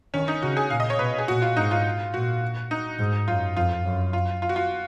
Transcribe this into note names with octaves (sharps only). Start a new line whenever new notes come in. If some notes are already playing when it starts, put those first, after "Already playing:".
D#3 C#4
D#4
C#3 F#4
G#4
A#2 F5
D#5
C#5
B2 B4
G#4
A#2 F#4
F4
G#2 D#4
F4
A#2 F#4
D#4
G#2
F#2 F4
F2 F4
F#2
F4
F4
F#4
F4